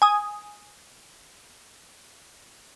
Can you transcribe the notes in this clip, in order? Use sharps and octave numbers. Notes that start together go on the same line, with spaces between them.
G#5 D#6